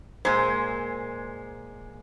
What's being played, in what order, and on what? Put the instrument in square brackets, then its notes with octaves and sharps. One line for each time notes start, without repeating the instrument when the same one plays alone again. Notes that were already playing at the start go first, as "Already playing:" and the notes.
[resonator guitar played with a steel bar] A#2 G#3 C5